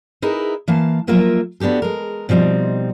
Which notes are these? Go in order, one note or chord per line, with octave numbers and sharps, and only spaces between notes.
D#4 E4 G#4 A#4 B4 D#5
E3 A#3 F5 A5
F3 F#3 A#3 F4 A#4 E5
B3 D4 F#4 G4 A4
G#3 A#4
B2 F3 G3 C4 D#4